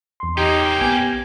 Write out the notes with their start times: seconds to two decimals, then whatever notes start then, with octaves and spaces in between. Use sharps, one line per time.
0.20 E2 C6
0.38 A#3 C#4 D#4 G4
0.81 A#1 B3 G#5